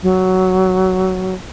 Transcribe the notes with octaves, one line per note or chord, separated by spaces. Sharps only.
F#3